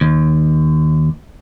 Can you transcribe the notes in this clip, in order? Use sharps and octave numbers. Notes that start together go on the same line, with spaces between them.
D#2